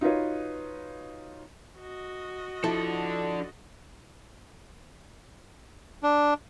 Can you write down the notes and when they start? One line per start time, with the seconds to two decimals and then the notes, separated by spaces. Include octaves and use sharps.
0.01 D#4 F4 F#4 B4 C#5
1.78 F#4 D#5
2.64 F3 D4 E4 A4
6.03 D4